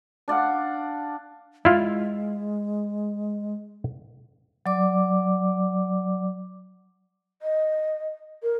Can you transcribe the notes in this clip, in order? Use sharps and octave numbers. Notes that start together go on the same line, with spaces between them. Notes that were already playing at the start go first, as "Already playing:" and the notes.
D4 D5 F5 F#5
G#3 E4 F4
F#3 D5 D6
D#5
A#4